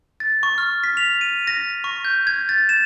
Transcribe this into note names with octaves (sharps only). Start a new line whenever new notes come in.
A6
C#6
F6
B6
F7
D#7
A#6
C#6
G6
G#6
A6
E7